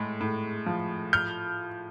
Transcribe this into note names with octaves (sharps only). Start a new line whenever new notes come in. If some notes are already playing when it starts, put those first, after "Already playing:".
Already playing: A2 G#3
A2
F3
F6 G6